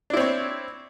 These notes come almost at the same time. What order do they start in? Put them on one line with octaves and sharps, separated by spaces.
D4 E4 C4 C#5